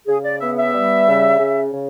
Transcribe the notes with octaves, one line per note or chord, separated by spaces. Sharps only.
C#3 G#4
D5
B3 E5
E5
G3
C#3
C#3
C#3